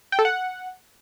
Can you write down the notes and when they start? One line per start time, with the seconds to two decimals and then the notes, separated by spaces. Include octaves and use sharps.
0.12 G5
0.19 A4
0.25 F#5